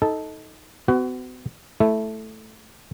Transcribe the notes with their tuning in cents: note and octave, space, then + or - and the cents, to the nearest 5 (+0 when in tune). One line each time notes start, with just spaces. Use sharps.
D#4 +15 A4 -5
B3 +45 F#4 +20
A3 -5 E4 +0